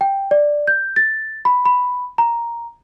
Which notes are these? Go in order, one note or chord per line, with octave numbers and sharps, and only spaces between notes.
G5
D5
G6
A6
B5
B5
A#5